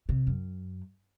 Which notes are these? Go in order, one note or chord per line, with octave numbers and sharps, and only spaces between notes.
C3
F#2